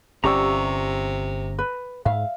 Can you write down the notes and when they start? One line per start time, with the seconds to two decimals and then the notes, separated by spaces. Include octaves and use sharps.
0.24 G1 C3 C#4 G4 D5 A#5 C#6 E6
1.59 B4
2.05 G#2 E5 F5